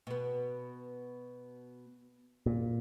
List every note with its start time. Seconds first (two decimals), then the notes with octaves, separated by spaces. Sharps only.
0.07 B2 B3
2.46 A#2